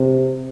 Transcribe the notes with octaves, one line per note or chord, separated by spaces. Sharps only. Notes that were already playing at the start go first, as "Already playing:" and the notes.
Already playing: C3